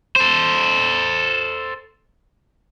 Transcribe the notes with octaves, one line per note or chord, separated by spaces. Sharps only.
A4 C5